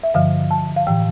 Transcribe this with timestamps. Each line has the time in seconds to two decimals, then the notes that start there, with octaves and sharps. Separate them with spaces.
0.03 E5
0.14 G2 D3 F3 F5
0.51 A5
0.76 F5
0.87 A2 E3 G5